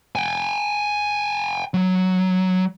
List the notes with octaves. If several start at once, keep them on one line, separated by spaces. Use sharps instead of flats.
G5 G#5
F#3